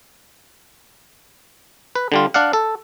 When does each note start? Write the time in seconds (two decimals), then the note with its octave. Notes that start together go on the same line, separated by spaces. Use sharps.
1.95 B4
2.12 D3 G3 F4
2.34 D4 D5 F5 F#5
2.53 A4